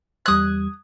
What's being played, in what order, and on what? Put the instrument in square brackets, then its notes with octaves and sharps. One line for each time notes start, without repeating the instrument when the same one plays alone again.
[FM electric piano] E2 G3 G#6 [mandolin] D#6 F#6